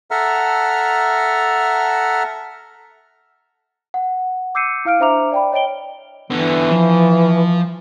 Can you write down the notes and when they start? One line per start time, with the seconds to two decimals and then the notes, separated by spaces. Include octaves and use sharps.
0.11 A4 E5 F#5 A#5 F6
3.94 F#5
4.55 D6 E6 G6 C7 C#7 D#7
4.85 E4 F5 F6 D7
5.00 D4 C5 E5 A#5 D6 F7
5.32 D5 G5 B5
5.53 C#5 D#5 G5 D7 G7
6.30 D3 E3 B3
6.71 F3